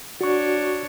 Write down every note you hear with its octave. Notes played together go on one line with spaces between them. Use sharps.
D4 F#4 C#5 C#6